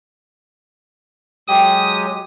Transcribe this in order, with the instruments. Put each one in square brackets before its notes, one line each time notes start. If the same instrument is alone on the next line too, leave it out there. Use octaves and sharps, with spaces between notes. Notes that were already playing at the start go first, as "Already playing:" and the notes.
[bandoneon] F#3 G#3 G4 [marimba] G5 [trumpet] D#6